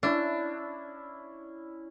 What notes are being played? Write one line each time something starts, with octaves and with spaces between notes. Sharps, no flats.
C#4 D4 E4 E5